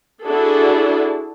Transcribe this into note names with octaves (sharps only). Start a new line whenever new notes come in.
D4 E4 F#4 G#4 A4